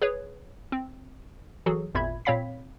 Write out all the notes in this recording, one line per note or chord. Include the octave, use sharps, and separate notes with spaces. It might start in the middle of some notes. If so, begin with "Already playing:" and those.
G#4 B4 C#5
C4
E3 F#3 F#4 G#4 A4
G#1 E2 A#2 E5 B5 G#6
A#2 C4 C#5 F5 B5 B6